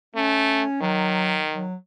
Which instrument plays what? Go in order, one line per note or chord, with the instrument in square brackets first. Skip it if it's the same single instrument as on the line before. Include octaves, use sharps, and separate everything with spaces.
[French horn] A3 [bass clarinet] C#4
[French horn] D#3 [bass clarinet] F#3
[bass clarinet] F#3